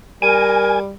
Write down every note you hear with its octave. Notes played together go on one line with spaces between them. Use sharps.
G3 A#4 G#5